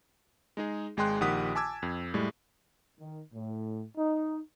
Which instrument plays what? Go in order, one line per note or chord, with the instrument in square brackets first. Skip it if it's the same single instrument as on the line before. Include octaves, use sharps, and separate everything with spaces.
[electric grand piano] G#3 D#4 G#4
G#1 G#3 G#4 G5 C6 F#6
A#1 D#3 G4 F#5 D#6 B6
G#5 A5 D6 E6 G#6
F2
A2 G3 G#3
[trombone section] D#3
A2
D#4